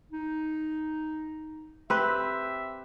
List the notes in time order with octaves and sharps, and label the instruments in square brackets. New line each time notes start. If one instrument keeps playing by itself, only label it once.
[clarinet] D#4
[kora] C4 G4 B4 [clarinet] E5